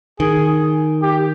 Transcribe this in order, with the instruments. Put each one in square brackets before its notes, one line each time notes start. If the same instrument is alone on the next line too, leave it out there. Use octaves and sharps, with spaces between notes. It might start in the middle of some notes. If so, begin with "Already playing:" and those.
[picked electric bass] D#3 [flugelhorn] G#4
[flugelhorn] G4